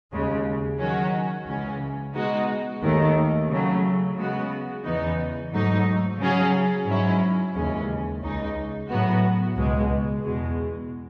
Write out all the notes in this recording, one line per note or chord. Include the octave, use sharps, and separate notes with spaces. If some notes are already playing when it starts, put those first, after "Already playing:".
D#2 C#3 G#3
D#3 F#3 C#4 F#4
C#2 C#3 E3 G#3 C#4
B2 G#3 D#4 F#4
D#2 D#3 A3
C#3 F#3 A3
C#3 G#3 B3 F#4
E2 C#3 E3 B3 D#4
G#2 F#3 A3 D#4
C#3 F#3 C#4 G#4
G#2 F#3 C#4 E4
D#2 C#3 E3 G#3 C#4
C#2 C#3 G#3 D#4
A2 F#3 B3 F#4
C#2 B2 G#3
E2 B2 G#3